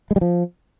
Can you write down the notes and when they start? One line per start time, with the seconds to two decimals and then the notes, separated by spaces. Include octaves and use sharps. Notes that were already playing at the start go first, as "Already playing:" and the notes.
0.11 G#3
0.16 G3
0.21 F3